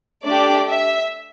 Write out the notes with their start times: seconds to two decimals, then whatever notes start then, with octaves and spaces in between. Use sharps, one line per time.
0.24 A3 D4 G4 D5
0.68 E5